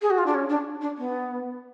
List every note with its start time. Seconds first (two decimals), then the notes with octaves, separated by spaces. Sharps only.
0.02 G#4
0.10 F#4
0.18 F4
0.26 D4
0.34 C#4
0.50 D4
0.81 D4
0.98 B3